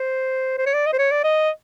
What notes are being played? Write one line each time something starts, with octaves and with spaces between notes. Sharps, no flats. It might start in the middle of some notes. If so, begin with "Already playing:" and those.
Already playing: C5
C5
C#5
D5
D#5
C5
C#5
D5
D#5